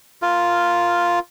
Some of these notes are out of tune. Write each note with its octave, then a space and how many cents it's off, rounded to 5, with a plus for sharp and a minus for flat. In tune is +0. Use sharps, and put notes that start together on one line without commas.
F4 +0 A#4 +0